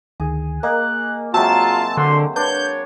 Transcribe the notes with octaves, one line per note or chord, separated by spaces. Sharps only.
D2 D#3 G#4
A#3 A#4 D#5 G#5 F#6
C3 F#3 G#3 F4 F#4 A5 E6
D3 C5 C6
D4 B4 C#5 G6